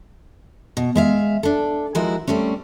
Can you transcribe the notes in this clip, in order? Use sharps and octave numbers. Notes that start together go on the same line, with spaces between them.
B2
G#3 E5 F5
D4 A4
F3 G#3 E4 F#4 A#4
G3 A3 C4 C#4